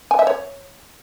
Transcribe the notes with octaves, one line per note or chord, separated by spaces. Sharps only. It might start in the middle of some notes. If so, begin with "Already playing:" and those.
G#5
E5
C#5